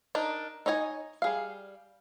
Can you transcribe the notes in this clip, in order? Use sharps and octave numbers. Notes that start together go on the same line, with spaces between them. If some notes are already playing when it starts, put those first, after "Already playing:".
D4 D#4 A#4
D#4 C#5 D#5 G#5
G3 G#4 F5